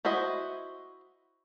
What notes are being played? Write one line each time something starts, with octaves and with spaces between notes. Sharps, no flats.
E4 F#4 C5 D#5 E5